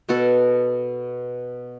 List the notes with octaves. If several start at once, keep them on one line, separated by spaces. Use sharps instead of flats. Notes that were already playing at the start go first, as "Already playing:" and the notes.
B2 B3 F#4 A4